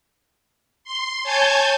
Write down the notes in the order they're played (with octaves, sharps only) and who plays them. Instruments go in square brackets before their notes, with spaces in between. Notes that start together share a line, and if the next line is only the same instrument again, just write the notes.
[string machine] C6
C#5 G#5 A5 G6 G#6